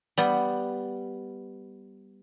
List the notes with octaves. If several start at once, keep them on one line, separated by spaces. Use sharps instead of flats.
G3 B3